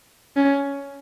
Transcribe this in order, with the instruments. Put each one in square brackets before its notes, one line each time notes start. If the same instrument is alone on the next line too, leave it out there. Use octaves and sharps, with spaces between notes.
[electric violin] C#4